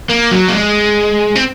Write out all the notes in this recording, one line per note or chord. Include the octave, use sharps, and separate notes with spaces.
A#3
F#3
A#3
G#3
C4